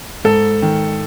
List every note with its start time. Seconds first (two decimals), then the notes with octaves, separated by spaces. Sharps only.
0.25 G#2 A4
0.62 D#3